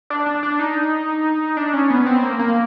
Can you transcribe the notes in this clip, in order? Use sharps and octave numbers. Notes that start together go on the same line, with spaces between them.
D4
D4
D4
D#4
D4
C#4
B3
C4
A#3
A#3